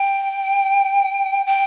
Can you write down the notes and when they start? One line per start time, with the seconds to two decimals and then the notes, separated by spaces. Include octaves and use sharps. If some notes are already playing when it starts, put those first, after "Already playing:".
Already playing: G5
1.46 G5